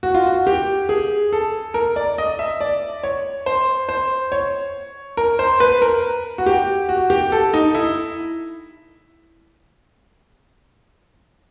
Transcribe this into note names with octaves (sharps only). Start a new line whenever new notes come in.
F#4
F4
F#4
G4
G#4
A4
A#4
D5
D#5
E5
D5
C#5
C5
C5
C#5
A#4
C5
B4
A#4
F#4
G4
F#4
G4
A4
D#4
E4